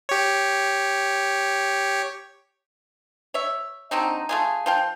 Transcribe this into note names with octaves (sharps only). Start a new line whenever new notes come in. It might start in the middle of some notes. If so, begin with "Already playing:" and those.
G4 C#5
C#5 E5
D3 F#3 C4 D#4
A3 F4 G#4
F3 F5 G5